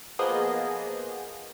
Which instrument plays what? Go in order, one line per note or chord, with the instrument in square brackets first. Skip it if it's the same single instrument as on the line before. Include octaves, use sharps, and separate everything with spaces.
[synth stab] F3 A#3 B3 G#4 C5 D#5